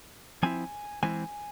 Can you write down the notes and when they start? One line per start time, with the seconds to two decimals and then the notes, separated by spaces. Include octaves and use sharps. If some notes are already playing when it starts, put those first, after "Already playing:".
0.43 F3 C4 E4 G#5
1.03 E3 G#3 C4 E4 G#5